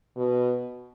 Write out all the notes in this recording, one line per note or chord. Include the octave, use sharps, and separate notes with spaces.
B2